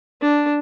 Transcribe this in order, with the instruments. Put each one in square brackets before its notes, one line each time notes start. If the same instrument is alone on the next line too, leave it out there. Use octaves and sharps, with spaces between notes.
[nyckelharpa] D4